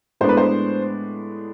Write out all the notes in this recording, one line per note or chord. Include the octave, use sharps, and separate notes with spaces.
A2 G#3 B3 D4 C5
B4
C5